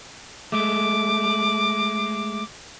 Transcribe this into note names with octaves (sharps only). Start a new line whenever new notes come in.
G#3 A3 D6